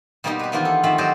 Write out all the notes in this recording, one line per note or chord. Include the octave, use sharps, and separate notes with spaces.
B2 G3 A#3 C4 D#4 G4
G4 B4
D#3 E3 A#3 B3 D4 F4
A4
D#3 F3 A3 C4 F5 B5
F#3 G4 C5 D5 D#5 A5